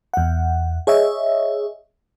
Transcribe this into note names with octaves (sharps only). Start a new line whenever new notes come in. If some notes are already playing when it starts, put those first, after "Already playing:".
E2 F#5
G#4 C#5 D#5 E5